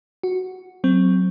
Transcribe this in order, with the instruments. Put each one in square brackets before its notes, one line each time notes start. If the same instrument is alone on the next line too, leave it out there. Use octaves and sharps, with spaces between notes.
[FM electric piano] F#4
F#3 C4